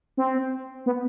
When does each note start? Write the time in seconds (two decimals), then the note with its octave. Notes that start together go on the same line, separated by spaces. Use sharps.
0.17 C4
0.86 B3